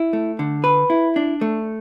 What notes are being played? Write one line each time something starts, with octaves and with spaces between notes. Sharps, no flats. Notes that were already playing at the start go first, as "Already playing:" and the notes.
Already playing: E4
A3
D3
B4
E4
D4
A3